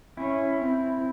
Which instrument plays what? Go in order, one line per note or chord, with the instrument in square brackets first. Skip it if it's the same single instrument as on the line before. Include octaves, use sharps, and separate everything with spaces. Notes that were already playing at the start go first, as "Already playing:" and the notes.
[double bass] C#4 [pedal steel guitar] E4
[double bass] C4